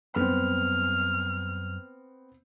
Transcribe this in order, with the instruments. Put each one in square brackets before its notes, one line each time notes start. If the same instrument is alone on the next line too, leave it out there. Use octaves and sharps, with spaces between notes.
[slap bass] F#2 G3 [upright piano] B3 C4 [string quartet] F6